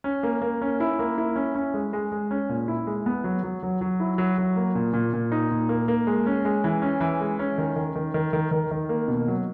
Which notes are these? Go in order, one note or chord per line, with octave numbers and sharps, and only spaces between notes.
C#4
A#3
A#3
C#4
E4
A#3
E4
C#4
C#4
G#3
G#3
G#3
C#4
A#2
E4
G#3
B3
F#3
F#3
F#3
F#3
E4
F#3
F#3
A#3
A#2
A#2
A#2
D#4
A#2
A#3
A#3
G#3
C#4
G#3
E3
C#4
E3
G#3
C#4
D#3
D#3
D#3
D#3
D#3
D#3
D#3
A#3
B2
F#3